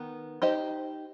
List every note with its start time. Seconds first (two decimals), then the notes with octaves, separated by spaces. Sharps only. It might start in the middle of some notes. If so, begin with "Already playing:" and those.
Already playing: D#3 B3
0.42 D#4 G4 C5 D#5